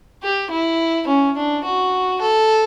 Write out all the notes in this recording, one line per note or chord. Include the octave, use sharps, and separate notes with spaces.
G4
E4
C#4
D4
F#4
A4